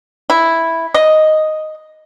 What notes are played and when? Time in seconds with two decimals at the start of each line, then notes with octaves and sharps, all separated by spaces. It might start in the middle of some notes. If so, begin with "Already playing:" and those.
0.30 E4
0.94 D#5